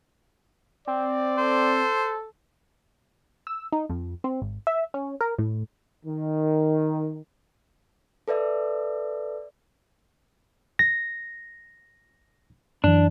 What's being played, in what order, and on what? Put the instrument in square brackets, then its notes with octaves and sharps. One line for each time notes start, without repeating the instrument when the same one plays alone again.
[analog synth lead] C4 [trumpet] D5
[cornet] A4 [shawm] C5
[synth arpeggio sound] E6
D#4
F2
C4
G#1
E5
C#4
A#4
A2
[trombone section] D#3
[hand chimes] A4 B4 D5 E5
[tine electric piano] A#6
[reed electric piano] F#2 E3 [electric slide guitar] D4